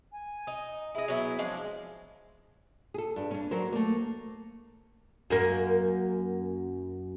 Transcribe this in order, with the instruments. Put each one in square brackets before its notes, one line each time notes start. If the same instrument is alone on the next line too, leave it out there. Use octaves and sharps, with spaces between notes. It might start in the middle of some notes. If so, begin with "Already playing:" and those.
[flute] G#5
[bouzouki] D#4
[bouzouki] E4 D#5 [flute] G#4
[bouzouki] F#3 B3 E4
F3 G#3 D4
[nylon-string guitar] G#4 A4
G2
C#4 D4
F#3 A#4 C5
A3 A#3
[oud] F#2 A#3